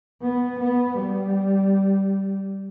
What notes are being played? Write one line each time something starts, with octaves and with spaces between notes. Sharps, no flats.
B3
B3
G3